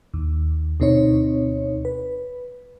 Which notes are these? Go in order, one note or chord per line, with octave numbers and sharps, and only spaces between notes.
D#2
D2 B2 C4 D#4 C#5
B4